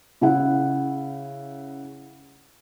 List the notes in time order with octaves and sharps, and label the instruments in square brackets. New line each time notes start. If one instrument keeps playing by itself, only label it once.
[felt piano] C#3 E4 F#5